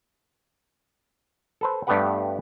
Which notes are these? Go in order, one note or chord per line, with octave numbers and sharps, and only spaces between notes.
A4 B4 C5
G2 A3 B3 G4 B4 F#5